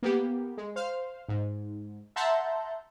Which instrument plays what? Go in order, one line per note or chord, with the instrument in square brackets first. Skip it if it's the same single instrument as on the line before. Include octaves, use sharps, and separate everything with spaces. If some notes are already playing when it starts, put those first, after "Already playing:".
[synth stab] A#3 B3 G4
G#3
C5 F5
G#2
E5 F#5 A5 A#5 C6 G6